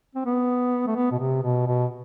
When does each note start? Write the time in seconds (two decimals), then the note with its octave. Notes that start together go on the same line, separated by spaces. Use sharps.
0.15 C4
0.26 B3
0.87 A3
0.96 B3
1.12 B2
1.19 C3
1.43 B2
1.67 B2